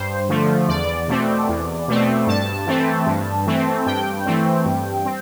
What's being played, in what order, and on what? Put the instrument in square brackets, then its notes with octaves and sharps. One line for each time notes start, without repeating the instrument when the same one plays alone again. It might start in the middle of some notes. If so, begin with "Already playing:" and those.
Already playing: [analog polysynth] G2 C5
D3 F3 A3
E2 D5
B2 A3 C4
E2
B2 A3 C4
G2 A5
E3 A3 C4
G2
E3 A3 C4
G2 G5
E3 A3 C4
G2
C4